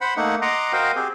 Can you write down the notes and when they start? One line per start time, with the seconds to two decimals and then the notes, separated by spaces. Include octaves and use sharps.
0.01 C5 F#5 B5
0.17 A3 A#3 D#4 F#5
0.42 D#5 F#5 A#5 C6 D6
0.73 F#4 A#4 C5 D#5 F5 G5
0.96 C4 G4 G#4